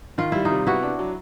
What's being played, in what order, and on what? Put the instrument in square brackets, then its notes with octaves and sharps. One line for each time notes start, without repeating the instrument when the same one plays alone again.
[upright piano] D#3 [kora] F4
[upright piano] G3 [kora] E4
[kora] D#4 F4
[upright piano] C3
[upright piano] B3 [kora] E4 F#4
[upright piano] D4
F#3